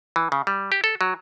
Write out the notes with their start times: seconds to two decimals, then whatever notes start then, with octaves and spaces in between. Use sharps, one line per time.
0.16 E3
0.32 C#3
0.47 G3
0.72 G4
0.84 A4
1.01 F#3